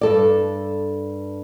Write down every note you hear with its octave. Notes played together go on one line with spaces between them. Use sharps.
G2 A4 D5